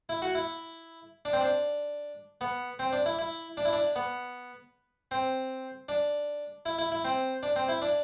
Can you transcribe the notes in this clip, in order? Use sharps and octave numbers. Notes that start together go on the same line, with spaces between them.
E4
F#4
E4
D4
C4
D4
B3
C4
D4
E4
E4
D4
E4
D4
B3
C4
D4
E4
E4
E4
C4
D4
C4
E4
D4